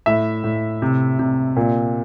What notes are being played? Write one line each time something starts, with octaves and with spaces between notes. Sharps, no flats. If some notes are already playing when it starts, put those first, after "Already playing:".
A2 E5
A2
C3
C3
A#2